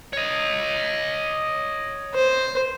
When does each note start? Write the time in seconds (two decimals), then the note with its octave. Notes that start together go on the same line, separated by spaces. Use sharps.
0.13 C#5 D#5
2.14 C5